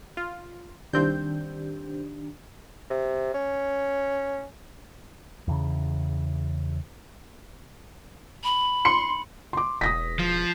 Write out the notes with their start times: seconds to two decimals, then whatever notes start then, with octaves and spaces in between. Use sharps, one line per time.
0.17 F4
0.93 C2 D#3 C4 D4 G4 G6
2.90 C3
3.34 C#4
5.48 E2 C#3
8.44 B5
8.85 C6 C#7
9.53 C6 D6
9.81 E1 D#6 A#6 B6
10.19 F3